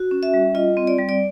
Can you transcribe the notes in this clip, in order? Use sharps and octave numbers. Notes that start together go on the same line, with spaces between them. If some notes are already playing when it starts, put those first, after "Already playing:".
Already playing: F#4
C#4
E5
G3
F4 D#5
C4
D5
G3
D5